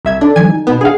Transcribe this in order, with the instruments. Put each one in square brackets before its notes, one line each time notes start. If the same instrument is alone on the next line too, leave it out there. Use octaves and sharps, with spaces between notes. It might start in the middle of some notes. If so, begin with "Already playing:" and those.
[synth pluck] C2 E5 G#6
[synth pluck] D4 [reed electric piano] A4 D5
[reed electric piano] D#3 F3 G3 [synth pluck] G#5 G#6
[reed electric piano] D#4
[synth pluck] B2 B3
[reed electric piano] D4 F#5 [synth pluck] G#4 F5